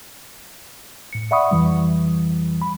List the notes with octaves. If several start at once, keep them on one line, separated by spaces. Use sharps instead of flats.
A2 C#7
D5 E5 F#5 B5 C#6 D#6
F2 E3 G3
B5